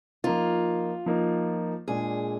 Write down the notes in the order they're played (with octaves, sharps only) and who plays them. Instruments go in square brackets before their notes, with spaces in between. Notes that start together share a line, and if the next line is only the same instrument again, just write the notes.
[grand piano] F3 A#3 D#4 [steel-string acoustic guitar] F4
[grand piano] F3 A#3 D#4
[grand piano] A#2 G#3 D4 [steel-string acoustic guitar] G#4